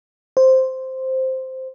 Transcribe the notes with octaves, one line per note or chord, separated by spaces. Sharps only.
C5